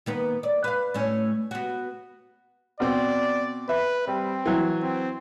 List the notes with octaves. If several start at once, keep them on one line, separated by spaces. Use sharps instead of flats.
D#3 A#3 B3
D5
B4 F5
A2 A3 C#4
B3 F#4
B2 C4 D5
B4 E5
G3 C4
E3 F#3
C4